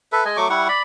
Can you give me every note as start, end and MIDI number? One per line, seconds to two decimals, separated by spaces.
0.12 0.24 69
0.12 0.24 71
0.12 0.24 76
0.25 0.37 56
0.25 0.37 75
0.25 0.37 80
0.37 0.48 54
0.37 0.48 57
0.37 0.48 85
0.37 0.48 86
0.49 0.68 55
0.49 0.68 64
0.49 0.68 78
0.49 0.68 85
0.69 0.83 74
0.69 0.83 83